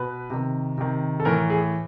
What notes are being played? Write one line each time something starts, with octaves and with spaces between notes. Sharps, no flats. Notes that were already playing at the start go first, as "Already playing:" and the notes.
Already playing: B2 B4
C3 D#3
C3 D#3
A4
A2 E3 A#4
G#4